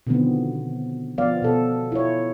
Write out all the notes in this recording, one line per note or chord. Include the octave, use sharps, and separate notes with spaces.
B2 D3 D#3 F3 B3 C4
F3 B3 D5 F5
B2 A4
E4 F4 C#5